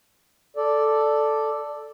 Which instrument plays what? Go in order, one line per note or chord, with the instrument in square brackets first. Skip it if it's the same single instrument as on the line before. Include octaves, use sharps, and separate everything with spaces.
[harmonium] A4 D5